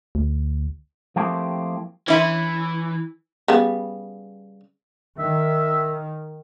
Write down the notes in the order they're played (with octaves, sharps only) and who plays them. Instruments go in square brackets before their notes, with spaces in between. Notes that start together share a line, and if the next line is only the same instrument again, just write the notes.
[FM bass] D2
[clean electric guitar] F3 A3 A#3 C4 E4 G4
[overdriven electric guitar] E3 [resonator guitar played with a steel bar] C#4 E4
[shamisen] C#3 G3 B3
[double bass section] D#3 [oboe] E5